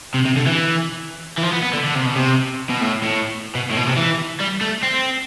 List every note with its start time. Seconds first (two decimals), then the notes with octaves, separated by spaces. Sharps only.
0.14 C3
0.25 C3
0.36 D3
0.46 E3
1.38 E3
1.43 F3
1.52 B3
1.63 B3
1.73 D3
1.84 D3
1.95 C3
2.05 B2
2.16 C3
2.70 B2
2.81 A2
3.03 A2
3.55 B2
3.70 A2
3.76 B2
3.87 C3
3.97 E3
4.40 G3
4.61 A3
4.83 C4